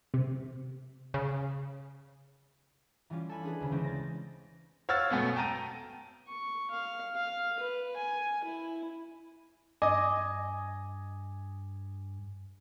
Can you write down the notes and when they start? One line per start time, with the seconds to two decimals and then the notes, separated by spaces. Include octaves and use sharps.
0.14 C3
1.14 C#3
3.10 E3 G3 C#4 F4
3.29 A4 G#5 B5
3.43 D4 G#4 B4
3.60 D2 C#3
3.72 C#3 E3 G#3 C4 C#4 G6
3.84 A6 A#6
4.89 C#5 F5 F#5 E6 F6 A6
5.10 F#2 B2 A3 B3
5.36 G5 A5 A#5 D#7
6.27 C#6
6.70 F5
7.14 F5
7.59 B4
7.96 G#5
8.44 E4
9.82 G2 D#5 G#5 D6 D#6